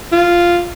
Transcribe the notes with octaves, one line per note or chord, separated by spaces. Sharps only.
F4